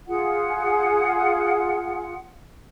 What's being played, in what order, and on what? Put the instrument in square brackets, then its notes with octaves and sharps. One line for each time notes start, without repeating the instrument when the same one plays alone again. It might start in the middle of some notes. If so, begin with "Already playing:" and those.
[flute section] F4 G#4 F#5